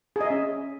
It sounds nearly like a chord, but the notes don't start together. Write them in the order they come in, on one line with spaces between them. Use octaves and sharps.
G#4 D#5 E5 C#4